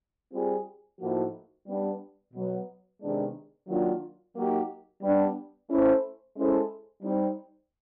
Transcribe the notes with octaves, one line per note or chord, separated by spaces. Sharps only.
G3 C4 F4 G#4
A2 F3 A#3 D#4 F#4
G3 B3 D4
B2 F#3 B3
C3 D#3 G#3 B3 D4
D#3 F#3 A#3 D4 F4
F#3 A#3 D#4 G4
G3 B3 D4
A3 C#4 E4 A4 C5
G#3 C#4 E4 A4 C5
G3 C4 D#4